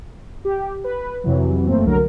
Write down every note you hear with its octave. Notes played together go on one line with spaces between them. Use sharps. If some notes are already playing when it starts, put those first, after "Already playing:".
G4
B4
F2 C3 E3 F#3
F#2 A3 A#3 C4
C2 D3 F#3 A#4